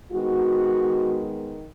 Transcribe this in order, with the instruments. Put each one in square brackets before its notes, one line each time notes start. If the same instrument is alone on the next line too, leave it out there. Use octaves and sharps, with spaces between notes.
[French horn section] D#3 G#3 B3 F#4